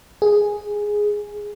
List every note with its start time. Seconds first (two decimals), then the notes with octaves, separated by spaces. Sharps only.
0.22 G#4